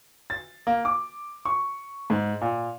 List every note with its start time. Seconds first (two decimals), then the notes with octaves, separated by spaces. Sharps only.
0.30 A6
0.67 A#3
0.85 D6
1.45 C#6
2.10 G#2
2.41 A#2